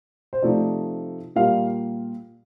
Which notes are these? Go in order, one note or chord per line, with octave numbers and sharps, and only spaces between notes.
C5
C3 F3 A3 D#4 D5
A#2 G3 A#3 F4 F5